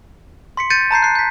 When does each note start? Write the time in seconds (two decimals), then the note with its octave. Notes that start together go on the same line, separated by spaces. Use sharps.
0.57 C6 B6 C#7
0.70 G6 A6 C#7 D#7
0.91 A5 A#5 G6 C7
1.02 F#6 C7
1.15 G6 B6